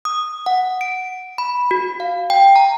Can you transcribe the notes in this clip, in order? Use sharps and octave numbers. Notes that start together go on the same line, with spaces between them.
D#6
F#5
D7
B5
F#4
F5
G5
A#5